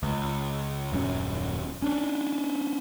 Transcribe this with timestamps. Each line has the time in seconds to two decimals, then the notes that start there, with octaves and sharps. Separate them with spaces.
0.03 C#2
0.92 D#1 F#2 A3 C#4
1.82 C#4 D4